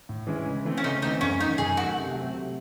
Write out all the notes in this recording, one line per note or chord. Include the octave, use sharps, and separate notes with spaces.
A2
E3 G#3 C#4 E4
C#3
E3 A3 C4
C#4
C#3 D#4
E3 A3 C4 D#4
F#2 C#4
D#3 A3 D#4
F#2 G#4
D#3 A3 F#4
C3
F#3 A3 C4
C3